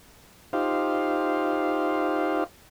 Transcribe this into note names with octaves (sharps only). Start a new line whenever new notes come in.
D#4 F4 G4 C5 F5